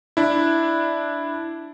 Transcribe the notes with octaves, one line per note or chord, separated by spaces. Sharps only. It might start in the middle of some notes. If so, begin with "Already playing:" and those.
D4 E4